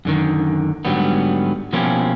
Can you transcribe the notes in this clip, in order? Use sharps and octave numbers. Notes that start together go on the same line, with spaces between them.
F#2 D3 D#3
G#2 D3 F#3 G3 B3
B2 F3 A#3 C#4 E4 G4